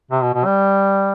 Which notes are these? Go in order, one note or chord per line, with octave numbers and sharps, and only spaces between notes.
C3
B2
B2
G3